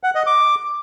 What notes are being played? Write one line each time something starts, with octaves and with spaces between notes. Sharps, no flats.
F#5
D#5
D6